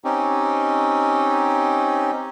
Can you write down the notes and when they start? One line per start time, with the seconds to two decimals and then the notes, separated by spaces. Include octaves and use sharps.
0.04 C4 C#4 D#4 G4